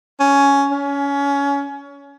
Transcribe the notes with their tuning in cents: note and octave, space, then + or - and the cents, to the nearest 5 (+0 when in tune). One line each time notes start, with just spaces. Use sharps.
C#4 +10
C#4 +25